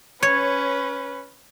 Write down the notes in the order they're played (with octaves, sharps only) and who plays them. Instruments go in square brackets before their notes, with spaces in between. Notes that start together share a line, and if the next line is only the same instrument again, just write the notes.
[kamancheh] C#4 B4 [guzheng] C#5